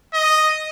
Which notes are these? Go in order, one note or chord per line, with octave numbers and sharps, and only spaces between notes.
D#5